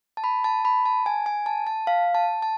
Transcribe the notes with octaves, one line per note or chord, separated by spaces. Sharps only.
A5
B5
A5
B5
A5
G#5
G#5
A5
A5
F5
A5
A5